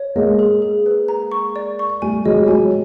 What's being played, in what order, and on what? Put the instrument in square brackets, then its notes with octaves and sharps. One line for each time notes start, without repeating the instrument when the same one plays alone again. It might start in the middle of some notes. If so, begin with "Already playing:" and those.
Already playing: [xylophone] C#5
[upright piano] G#3 A#3 [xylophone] D#5
[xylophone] G#4
G#4
B4
A#5
C#6
D5
C#6
[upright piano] G3 A3 [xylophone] G#5
[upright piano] F#3 G#3 [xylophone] D#5
[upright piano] G3
[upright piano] F#3 G#3 [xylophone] G#5